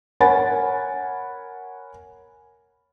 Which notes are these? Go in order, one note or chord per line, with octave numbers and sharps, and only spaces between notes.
A#4 C#5 F#5 G#5 B5 A6